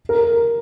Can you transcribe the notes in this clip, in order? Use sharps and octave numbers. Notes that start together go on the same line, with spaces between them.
A#4